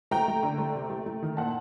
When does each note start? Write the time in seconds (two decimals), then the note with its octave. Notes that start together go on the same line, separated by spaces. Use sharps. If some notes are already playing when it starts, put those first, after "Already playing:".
0.11 A3 G5 A#5
0.28 A3
0.43 D3
0.58 A3
0.75 C3
0.90 A3
1.06 A3
1.22 D#3
1.37 A#2 F#5 A5